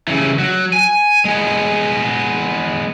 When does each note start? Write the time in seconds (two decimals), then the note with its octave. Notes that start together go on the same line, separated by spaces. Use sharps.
0.08 C#3 E3
0.39 F#3
0.73 G#5
1.25 G#3 B3